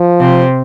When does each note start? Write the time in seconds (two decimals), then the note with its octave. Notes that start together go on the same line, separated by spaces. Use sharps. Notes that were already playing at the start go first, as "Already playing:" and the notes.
Already playing: F3
0.20 C3 C4